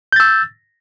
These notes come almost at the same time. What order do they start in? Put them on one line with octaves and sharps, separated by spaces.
G6 A6 E6